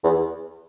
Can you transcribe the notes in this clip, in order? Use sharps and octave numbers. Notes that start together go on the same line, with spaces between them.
E2